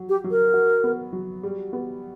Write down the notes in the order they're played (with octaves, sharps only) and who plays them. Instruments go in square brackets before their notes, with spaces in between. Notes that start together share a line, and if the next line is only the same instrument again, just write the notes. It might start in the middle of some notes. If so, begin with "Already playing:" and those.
Already playing: [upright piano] F#3 F#4
[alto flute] G4
[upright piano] F#3
[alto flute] A#4
[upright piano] F#4
B3
F#3
G3
B3